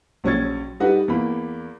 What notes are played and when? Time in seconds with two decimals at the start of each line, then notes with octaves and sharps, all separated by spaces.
0.24 A#1 F#3 C#4 C#6 G#6 A6
0.80 G3 D#4 F#4 G4 B4
1.08 E2 A#3 B5